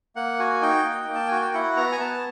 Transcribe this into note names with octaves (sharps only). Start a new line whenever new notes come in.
A#3 F#5
F#4 G#5
D#4 G5
A#3
A#3
A5
F#4 G#5
G5
E4 F#5
B3 A#5
G#5
B3 A5